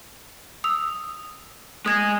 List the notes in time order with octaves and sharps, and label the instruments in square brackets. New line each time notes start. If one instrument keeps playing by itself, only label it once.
[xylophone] D#6 E6 F7
[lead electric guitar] G#3 [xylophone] D#6 G#6 A#6